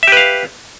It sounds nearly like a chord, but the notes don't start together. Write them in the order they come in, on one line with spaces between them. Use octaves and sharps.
E5 G4 B4 F5